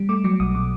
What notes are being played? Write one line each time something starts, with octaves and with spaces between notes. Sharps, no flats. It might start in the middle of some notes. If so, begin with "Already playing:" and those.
Already playing: G3
A3 D6
F#3 D6
B1 D#6
B2 D6